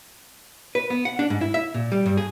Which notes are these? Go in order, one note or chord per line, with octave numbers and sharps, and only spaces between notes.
B4
B3
F#5
D4
G#2
E4
E5
A#2
G3
G2
G#4